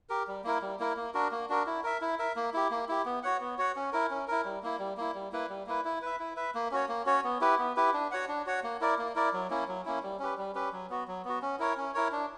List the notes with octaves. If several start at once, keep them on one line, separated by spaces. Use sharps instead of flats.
G4 A#4
G3
A#3 E4 A#4
G3
A#3 E4 A#4
A#3
D4 F#4 A#4
A#3
D4 F#4 A#4
E4
A#4 E5
E4
A#4 E5
A#3
E4 G4
A#3
E4 G4
B3
F#4 C#5 F#5
B3
F#4 C#5 F#5
C#4
E4 A#4
C#4
E4 A#4
G3
A#3 E4
G3
A#3 E4
G3
A#3 E4 B4
G3
A#3 E4 B4
E4
B4 E5
E4
B4 E5
A#3
C#4 F#4 C#5
A#3
C#4 F#4 C#5
B3
E4 G4 B4
B3
E4 G4 B4
D4
F#4 C#5 F#5
D4
F#4 C#5 F#5
A#3
E4 A#4 D5
A#3
E4 A#4 D5
F#3
A#3 C#4 E4
F#3
A#3 C#4 E4
G3
C#4 G4 B4
G3
C#4 G4 B4
F#3
B3 F#4
F#3
B3 F#4
C#4
E4 A#4 C#5
C#4
E4 A#4 C#5
D4